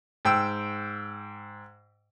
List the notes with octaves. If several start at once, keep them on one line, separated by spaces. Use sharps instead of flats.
G#2 G5 E6